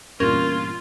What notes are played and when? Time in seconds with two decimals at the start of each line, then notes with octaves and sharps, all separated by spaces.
0.20 E2 G2 A#2 C#4 F4 A#4